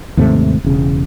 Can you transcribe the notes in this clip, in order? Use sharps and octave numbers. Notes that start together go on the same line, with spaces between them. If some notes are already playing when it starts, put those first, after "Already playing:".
D#2 G#2 C3 A3
E1 C#3